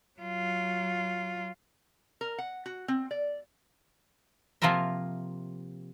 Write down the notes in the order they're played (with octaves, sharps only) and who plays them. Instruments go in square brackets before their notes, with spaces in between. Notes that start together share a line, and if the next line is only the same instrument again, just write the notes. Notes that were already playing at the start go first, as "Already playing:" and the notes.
[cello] F#3 F4
[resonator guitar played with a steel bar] A#4
F#5
F#4
C4
D5
[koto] C3 F3 A#3 F4 A#4 E5